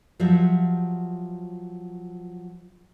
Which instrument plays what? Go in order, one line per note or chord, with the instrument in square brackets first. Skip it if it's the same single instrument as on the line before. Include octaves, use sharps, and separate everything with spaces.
[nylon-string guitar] F3 F#3 F4 G4 E5 F#5